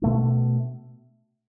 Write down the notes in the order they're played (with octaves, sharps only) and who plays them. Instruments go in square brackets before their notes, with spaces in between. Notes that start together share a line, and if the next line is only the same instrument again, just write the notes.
[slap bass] B2 A3 D4